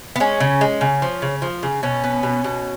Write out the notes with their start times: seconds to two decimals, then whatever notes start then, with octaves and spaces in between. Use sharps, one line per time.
0.16 B3
0.20 G#3 C#4
0.40 C#3
0.61 G#3
0.81 C#3
1.02 F3
1.22 C#3
1.42 F3
1.63 C#3
1.83 B2 C#4
2.04 B3
2.23 B2
2.44 B2